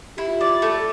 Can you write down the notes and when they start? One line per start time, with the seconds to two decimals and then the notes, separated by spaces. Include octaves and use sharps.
0.17 E4 G4
0.28 F4
0.40 G4 D5
0.62 A3